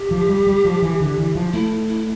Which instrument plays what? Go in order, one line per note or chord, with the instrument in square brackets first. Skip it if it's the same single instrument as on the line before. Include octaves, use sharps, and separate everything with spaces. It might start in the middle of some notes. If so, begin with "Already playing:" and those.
Already playing: [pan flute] G4
[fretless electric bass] F3
G3
G3
F3
E3
D3
E3
F3
[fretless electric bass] A3 [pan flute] E4
[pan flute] E4